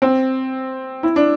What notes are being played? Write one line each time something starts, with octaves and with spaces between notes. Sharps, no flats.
C4
E4
D4